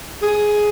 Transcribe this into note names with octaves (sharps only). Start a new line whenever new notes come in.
G#4